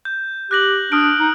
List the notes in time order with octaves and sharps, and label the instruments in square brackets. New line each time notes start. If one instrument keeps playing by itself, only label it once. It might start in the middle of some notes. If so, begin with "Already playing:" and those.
[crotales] G6
[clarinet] G4 [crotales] F#6 A#6 F#7
[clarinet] D4 [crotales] D#6 F6 D7
[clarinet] D#4